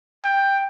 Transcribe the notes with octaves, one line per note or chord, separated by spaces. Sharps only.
G5